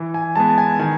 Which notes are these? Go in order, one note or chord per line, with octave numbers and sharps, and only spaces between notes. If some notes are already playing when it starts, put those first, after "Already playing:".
Already playing: E3
G#5
G#3 B3 A5
G#5
D#3 G#5